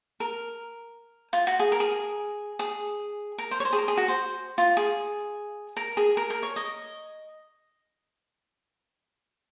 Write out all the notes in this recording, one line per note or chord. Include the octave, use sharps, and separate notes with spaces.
A#4
F4
F#4
G#4
A#4
G#4
G#4
A#4
C5
C#5
C5
G#4
A#4
G#4
F#4
C5
F4
G#4
A#4
G#4
A#4
A#4
C#5
D#5